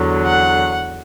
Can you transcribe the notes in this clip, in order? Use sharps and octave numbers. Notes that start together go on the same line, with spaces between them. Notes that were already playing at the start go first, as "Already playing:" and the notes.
Already playing: E2 D3 F#3
F#5